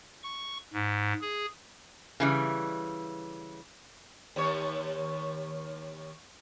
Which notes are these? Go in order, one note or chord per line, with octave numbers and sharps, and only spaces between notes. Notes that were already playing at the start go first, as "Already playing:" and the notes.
C#6
G#2
G#4
C#3 E3 G3
D#2 C#5